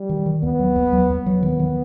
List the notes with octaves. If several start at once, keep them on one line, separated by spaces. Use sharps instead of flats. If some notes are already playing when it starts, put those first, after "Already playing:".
Already playing: G3
D#3
D#3
D#2 B3
F#3
D#2
F#3
D#2
F#3
D#3 B3
D#3